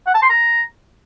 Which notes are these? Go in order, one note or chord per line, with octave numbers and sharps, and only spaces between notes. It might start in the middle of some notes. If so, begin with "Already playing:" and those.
F#5
A5
C6
A#5